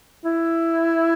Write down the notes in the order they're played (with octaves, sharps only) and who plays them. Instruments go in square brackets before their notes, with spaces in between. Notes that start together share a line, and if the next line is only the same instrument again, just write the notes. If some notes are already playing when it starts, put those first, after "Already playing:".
[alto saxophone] E4